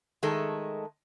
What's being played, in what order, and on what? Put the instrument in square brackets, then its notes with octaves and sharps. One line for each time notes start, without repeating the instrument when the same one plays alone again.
[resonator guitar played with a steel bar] D#3 G#3 A3 A4